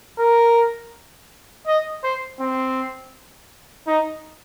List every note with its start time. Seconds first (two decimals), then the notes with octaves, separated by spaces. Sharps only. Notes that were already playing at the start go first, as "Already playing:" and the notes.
0.19 A#4
1.67 D#5
2.03 C5
2.40 C4
3.87 D#4